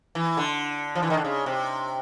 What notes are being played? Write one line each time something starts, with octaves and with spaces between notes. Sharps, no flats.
E3
D3
F3
E3
D#3
D3
C#3
C3